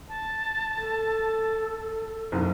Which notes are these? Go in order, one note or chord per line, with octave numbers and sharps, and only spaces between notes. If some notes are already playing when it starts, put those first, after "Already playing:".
A5
A4
F#1 B1